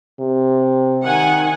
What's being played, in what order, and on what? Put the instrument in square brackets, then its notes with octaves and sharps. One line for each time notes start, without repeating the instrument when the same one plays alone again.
[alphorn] C3
[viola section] D#3 F#5 G#5